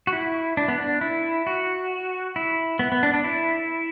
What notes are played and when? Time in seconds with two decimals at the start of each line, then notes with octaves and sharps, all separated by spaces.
0.07 F#4
0.13 E4
0.57 D4
0.68 B3
0.78 D4
1.01 E4
1.47 F#4
2.36 E4
2.79 B3
2.92 B3
3.03 D4
3.14 D4
3.24 E4